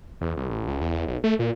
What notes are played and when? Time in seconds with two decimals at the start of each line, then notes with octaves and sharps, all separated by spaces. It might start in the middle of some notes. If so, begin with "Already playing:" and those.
0.21 E2
0.37 C2
0.50 A1
0.67 C#2
0.81 E2
0.94 E2
1.07 B1
1.24 A3
1.39 A#2